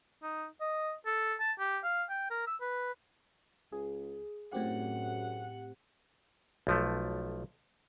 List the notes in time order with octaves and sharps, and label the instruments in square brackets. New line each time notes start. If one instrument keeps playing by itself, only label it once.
[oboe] D#4
D#5
A4
A5
G4
F5
G5
A#4
E6
B4
[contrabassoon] C#2 [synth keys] G#4
[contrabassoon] F#2 [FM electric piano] A2 C4 G4 [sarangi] F#5
[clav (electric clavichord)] B1 F3 A3